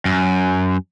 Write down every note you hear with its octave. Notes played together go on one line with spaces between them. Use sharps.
F#2